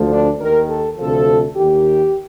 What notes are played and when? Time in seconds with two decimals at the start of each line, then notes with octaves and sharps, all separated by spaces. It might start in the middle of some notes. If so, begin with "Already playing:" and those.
Already playing: D2 D3 F3
0.13 D4
0.40 D#2 D#3 A#4
0.69 A4
0.98 D2 C3 F3 A4
1.56 D#2 D#3 G4